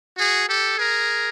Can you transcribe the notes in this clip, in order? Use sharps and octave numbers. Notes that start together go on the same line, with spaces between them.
F#4 G#4
G4 A4
G#4 A#4